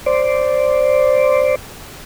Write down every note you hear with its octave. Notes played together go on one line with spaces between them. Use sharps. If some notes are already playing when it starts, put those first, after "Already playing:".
C5 D5